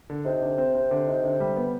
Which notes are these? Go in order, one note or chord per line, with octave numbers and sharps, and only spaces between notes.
D3
C3 D#4
D3
C4
C4
D3
D#4
D3
G3
B3